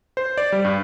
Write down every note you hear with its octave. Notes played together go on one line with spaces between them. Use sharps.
C5
D5
G3
G2